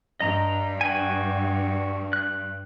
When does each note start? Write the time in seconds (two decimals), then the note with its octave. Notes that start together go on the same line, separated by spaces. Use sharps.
0.20 G2 D#5 A#5
0.81 F#4 G5 G#5
2.13 F#6